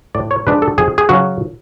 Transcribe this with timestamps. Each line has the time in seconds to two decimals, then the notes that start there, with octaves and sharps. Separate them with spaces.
0.15 A2 D5
0.31 C#5
0.47 F3 G#3 D4 B4
0.62 A4
0.78 F2 G#4
0.98 G#4
1.09 C#3 F#3 C#4 F#4